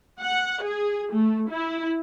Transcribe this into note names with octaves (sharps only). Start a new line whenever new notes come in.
F#5
G#4
A3
E4